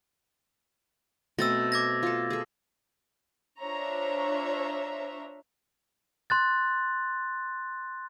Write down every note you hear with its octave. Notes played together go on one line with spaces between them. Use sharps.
B2 A3 C4 E6 A6 A#6
D6 G#6 A#6
F4 A4
G#4 A4
D4 F4 C5 C#5 E5 A#5
C6 F#6 A6